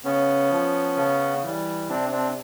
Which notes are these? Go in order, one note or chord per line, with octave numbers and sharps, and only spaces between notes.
C#3 B3 C#4
F3
C#3
E3 G3
C3 C4 D4
C4 D4